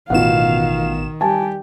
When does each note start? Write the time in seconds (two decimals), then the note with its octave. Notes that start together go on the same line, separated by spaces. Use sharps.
0.10 A1 B2 D#3 F4 F5 F#5 E7
1.21 G3 G4 G#5 A5